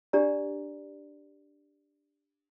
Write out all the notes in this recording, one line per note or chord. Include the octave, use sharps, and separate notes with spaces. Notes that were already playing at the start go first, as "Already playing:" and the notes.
D4 G4 D5 A#5